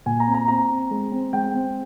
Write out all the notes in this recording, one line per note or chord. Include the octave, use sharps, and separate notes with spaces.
A#2 G#5
A#5
C4
A#5
C4 A#5
C4
G#3
C4
G#3 G5
C4